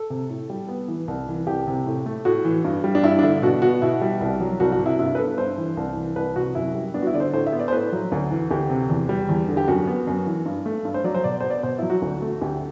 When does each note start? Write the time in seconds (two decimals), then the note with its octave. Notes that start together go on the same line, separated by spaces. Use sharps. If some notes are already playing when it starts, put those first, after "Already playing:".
Already playing: A4
0.10 C3
0.30 A2
0.50 G3
0.68 B3
0.88 E3
1.08 C2
1.28 E3
1.47 C2 G4
1.67 C3
1.87 A2
2.06 A3
2.25 A2 F#4
2.45 E3
2.64 G2
2.84 G3
2.95 D4
3.03 G2 E4
3.19 D4
3.23 D3 E4
3.42 B2 F#4
3.62 B3 F#4
3.82 B2 E4
4.01 G3
4.21 C2
4.40 F#3
4.60 C2 F#4
4.72 F#4
4.79 C3
4.86 E4
4.99 G2 E4
5.15 B4
5.18 B3 A4
5.38 G2 C5
5.58 E3
5.77 C2
5.97 E3
6.16 C2 B4
6.36 C3 F#4
6.55 F#2 E4
6.75 G3
6.94 B3 D4
7.02 F#4
7.07 E4
7.14 D3 D5
7.20 C5
7.33 A2 C5
7.47 E5
7.53 B3
7.60 D5
7.68 C5
7.72 A2 B4
7.92 F#3
8.12 D2
8.31 E3
8.51 D2 G4
8.70 C3
8.90 E2
9.09 G3
9.29 E2
9.49 D3
9.57 G4
9.68 F#2 F#4
9.87 B3
10.07 F#2
10.27 E3
10.46 G2
10.66 A3
10.85 G2
10.94 C5
11.04 F#3 D5
11.15 C5
11.24 B2 D5
11.41 B3 C5
11.50 D5
11.63 B2 C5
11.78 F#3 E4
11.90 F#4
12.02 D2
12.22 A3
12.41 D2 G4